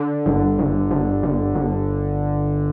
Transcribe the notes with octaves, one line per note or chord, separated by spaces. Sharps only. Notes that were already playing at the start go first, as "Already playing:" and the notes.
Already playing: D3
G1
G1
G1
G1
G1